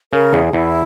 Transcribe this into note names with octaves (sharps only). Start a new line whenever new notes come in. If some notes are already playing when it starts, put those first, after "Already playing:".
C#3 A#4
E2 G#4
E2 E4